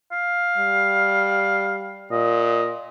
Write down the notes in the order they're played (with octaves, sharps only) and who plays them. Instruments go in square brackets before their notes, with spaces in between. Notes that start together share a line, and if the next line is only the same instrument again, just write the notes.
[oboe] F5
[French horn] G3
[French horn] A#2 [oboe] D#5